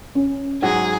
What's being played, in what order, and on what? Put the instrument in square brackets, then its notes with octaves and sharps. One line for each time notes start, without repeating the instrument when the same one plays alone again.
[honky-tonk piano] C#4
[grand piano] G#2 F#3 F#4 [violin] G#4 [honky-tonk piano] F#5